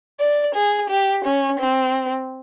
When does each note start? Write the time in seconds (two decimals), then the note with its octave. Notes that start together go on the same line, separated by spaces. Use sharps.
0.20 D5
0.55 G#4
0.90 G4
1.25 C#4
1.60 C4